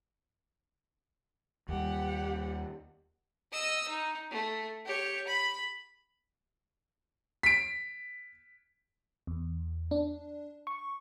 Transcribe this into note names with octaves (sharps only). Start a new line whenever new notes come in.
D#2 G3 G4 F#5
D#5 E6
D#4
A3
G4 C#5
B5
B6 D7
E2
D4
C#6